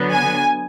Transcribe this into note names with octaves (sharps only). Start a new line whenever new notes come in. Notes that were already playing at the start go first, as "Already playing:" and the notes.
Already playing: D3 F#3 B3
G#5